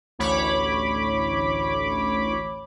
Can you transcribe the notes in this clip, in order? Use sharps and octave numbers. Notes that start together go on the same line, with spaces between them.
A1 D2 C#5 B5 D6